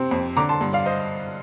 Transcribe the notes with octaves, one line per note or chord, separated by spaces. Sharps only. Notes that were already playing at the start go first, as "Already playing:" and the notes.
Already playing: C3 C4
F2
D3 A#5 D6
A5 C6
G2
D5 F5
C5 D#5